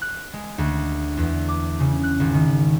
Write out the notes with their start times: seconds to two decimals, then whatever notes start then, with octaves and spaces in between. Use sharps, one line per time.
0.02 F#6
0.33 G#3
0.58 D2
1.17 E2
1.48 D6
1.80 C#3
2.03 F#6
2.20 G#1
2.34 D#3